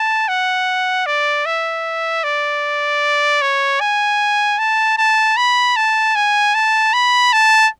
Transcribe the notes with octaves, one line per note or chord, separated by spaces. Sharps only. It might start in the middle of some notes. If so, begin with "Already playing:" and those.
Already playing: A5
F#5
D5
E5
D5
C#5
G#5
A5
A5
B5
A5
G#5
A5
B5
A5